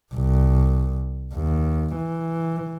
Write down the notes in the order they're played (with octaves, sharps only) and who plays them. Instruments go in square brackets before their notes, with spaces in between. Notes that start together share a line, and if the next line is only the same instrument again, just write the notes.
[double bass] C2
D#2
E3